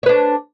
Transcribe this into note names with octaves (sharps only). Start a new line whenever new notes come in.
D4 B4 C#5